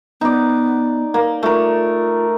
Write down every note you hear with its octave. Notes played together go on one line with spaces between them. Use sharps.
B3 D#4 D5
A#3
A3 F4 A#4